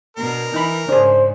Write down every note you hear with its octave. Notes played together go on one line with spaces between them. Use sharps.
B2 D4 A#4
E3 D#4 B5
G#2 C#3 D4 G#4 C5